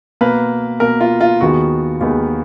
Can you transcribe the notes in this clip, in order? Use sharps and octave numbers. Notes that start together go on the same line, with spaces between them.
B2 A#3 B4
B2 A#3 A#4
F4
F4
D#2 D#3 G#3 B3 F#4
D#2 D#3 G#3 B3